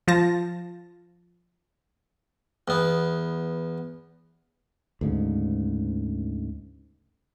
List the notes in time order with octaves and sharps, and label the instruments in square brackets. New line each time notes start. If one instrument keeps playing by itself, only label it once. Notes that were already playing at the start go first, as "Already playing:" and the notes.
[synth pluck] F3 F4 A5 A#6
[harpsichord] E2 B3
[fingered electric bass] D2 G#2 C#3